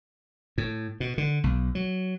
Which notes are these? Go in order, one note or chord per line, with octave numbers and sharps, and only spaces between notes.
A2
B2
D3
B1
F#3